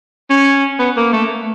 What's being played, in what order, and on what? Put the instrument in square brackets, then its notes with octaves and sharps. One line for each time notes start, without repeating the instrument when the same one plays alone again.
[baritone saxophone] C#4
B3
A#3
A3